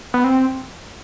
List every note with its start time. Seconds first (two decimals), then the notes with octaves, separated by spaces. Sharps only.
0.14 B3
0.24 C4